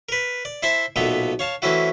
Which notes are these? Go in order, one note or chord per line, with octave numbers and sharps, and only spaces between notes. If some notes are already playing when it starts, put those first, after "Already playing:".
A#4 B4
D5
E4 C5 E5 A5 C6
B1 A#2 A3 B3 A4 A#5
C#5 F5 A5
E3 A3 C4 C#4 E4 F#4